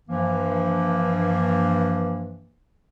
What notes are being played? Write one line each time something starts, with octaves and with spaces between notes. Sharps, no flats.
G2 E3 F3 A#3